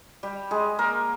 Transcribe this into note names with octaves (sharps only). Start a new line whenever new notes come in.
G3 G4
G#3 G#4
A#3 A#4